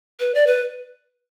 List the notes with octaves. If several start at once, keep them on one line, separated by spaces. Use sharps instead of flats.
B4
D5
B4